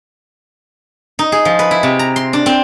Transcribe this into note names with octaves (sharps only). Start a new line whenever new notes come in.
D#4
G#4
F3
B4
E4
C3
A#5
C6
D4
C4